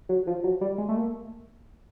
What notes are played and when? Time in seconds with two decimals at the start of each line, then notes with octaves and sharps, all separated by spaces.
0.09 F#3
0.27 F3
0.44 F#3
0.61 G3
0.78 G#3
0.89 A3
0.96 A#3